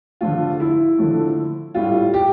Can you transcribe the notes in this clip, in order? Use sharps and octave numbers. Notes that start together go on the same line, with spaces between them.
D3 F3 A3 F4
E4
D3 F3 A3
A2 G3 F4
G4